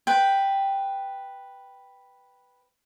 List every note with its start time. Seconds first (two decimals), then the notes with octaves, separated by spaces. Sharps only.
0.07 B4 G5